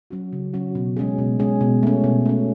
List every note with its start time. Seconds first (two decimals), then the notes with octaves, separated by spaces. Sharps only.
0.11 F#3 C#4 F#4
0.33 C#3
0.53 F#3 C#4 F#4
0.75 B2
0.97 G#3 C#4 G#4
1.18 B2
1.40 G#3 C#4 G#4
1.61 B2
1.83 A3 C#4
2.04 B2
2.25 A3 C#4